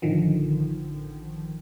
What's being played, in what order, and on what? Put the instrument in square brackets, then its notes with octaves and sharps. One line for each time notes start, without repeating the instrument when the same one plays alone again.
[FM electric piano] A1 D3 D#3 F3